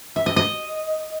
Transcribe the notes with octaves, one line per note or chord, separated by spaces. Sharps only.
E5
D#5
D#5